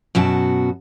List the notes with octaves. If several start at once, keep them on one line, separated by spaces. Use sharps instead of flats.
F#2 B2 F#4 A5